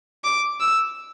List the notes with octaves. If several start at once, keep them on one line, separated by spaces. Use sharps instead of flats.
D6
E6